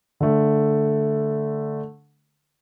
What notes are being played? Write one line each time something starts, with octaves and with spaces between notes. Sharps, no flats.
D3 A3